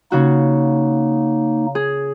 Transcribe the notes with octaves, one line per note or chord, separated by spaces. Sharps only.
C#3 A#3 D#4 F#4
G#4